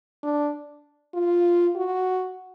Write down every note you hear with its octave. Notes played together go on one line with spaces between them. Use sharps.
D4
F4
F#4